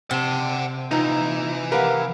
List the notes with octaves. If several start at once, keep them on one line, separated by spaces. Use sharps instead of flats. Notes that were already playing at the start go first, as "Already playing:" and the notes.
C3 F#5 A5
F2 A#2 E3 D#4 A#5
G4 A#4 B4 F5 F#5